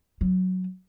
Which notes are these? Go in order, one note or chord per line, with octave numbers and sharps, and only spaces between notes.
F#3